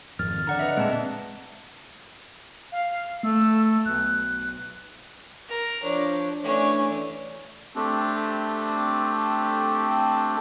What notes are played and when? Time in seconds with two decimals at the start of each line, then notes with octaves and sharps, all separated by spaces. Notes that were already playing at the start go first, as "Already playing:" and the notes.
0.19 G#1 F2 F6 A6
0.47 D3 D5 F#5 A#5
0.59 B4 D#5 E5
0.77 A#2 G#3 C4 D4 A5
2.72 F5
3.23 A3 E6
3.86 B1 F#6
5.48 A#4
5.83 F3 D4 C#5
6.43 E3 A3 C#4 D4 C#5
7.76 A3 C4 D4 G4